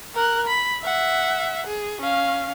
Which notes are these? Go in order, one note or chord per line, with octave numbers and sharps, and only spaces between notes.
A#4 F#6
B5
E5 F#5
G#4
C#4 F5